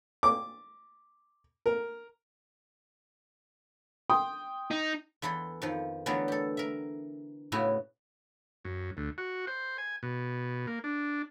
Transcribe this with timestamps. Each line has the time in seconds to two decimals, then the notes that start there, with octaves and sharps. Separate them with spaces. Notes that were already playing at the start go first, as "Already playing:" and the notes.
0.23 D6
1.66 A#4
4.10 G5 C6 D#6
4.71 D#4
5.22 E2 E3 E4 A4 C6
5.62 F2 D#3 F3
6.06 D3 E3 F#3 A3 B3 A#4
6.28 G4 A4
6.57 A#4 E5
7.52 A2 C#3 B3 E4 F#4
8.65 F#2
8.97 D2
9.18 F#4
9.47 C5
9.78 G#5
10.03 B2
10.67 A#3
10.84 D4